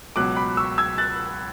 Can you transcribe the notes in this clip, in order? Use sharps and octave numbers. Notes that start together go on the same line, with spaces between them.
C#2 B2 F#3 D6 F#6
B5 D6
C#6 E6
E6 G#6
F#6 A6